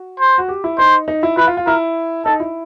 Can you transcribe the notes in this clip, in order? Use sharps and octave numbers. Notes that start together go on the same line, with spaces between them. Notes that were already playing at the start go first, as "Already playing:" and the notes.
Already playing: F#4
C5
F#4
G4
E4
D#4 C5
D#4
E4
E4 B4
F4
F4
E4 A#4
D#4 A4
E4